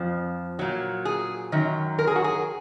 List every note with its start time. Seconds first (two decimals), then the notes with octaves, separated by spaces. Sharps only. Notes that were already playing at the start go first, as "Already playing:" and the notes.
Already playing: F2 F3
0.59 A#2 F#3
1.05 G#4
1.52 F#2 D#3 F#3
1.99 A#4
2.07 G#4
2.16 F#4
2.24 G#4